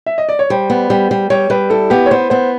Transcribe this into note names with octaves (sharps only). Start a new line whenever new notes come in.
E5
D#5
D5
C#5
G3 C5
B3
G3
G3
G3 C#5
G3 B4
E4 A4
B3 G4
C#5
B3 C5
B3 C5